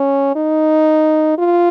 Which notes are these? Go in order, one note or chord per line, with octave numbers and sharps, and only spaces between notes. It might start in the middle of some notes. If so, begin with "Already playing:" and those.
Already playing: C#4
D#4
F4